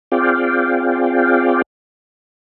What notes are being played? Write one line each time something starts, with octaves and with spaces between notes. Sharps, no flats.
C4 F4 G#4 D5 F5 G5